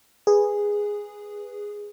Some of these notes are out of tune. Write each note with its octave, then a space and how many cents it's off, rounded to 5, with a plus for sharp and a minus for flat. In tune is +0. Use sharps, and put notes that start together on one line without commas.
G#4 -10 B4 +0